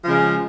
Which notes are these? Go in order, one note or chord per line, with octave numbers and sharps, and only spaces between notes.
C#3 F3 G#3